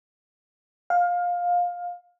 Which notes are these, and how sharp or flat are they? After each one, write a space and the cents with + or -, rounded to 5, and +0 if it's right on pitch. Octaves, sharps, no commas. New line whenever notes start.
F5 +20